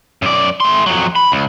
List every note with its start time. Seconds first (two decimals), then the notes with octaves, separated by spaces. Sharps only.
0.22 F#2 D5
0.60 A3 C6
0.86 F2 F#3
1.16 B5
1.32 C#2